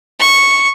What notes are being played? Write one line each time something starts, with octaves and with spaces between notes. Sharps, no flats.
C#6